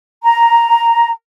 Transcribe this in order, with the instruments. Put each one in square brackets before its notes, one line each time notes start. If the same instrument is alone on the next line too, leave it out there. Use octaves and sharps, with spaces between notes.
[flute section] A#5